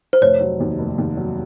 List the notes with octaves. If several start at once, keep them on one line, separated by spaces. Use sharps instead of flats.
C5
F1 C#5
F#3
D#2
F1
D#2
F#3